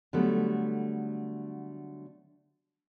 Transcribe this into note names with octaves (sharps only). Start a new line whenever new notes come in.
D3 F#3 G3 A3 B3